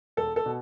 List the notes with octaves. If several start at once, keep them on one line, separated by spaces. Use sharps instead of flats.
E1 A4
A4
B2